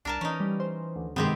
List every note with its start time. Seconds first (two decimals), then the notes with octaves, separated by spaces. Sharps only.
0.05 C2 D4 A#4 A5
0.21 E3 C#4 D#4
0.40 G3
0.60 C5
0.96 D2
1.16 G2 C3 D#3 G#3 B3 C4 G4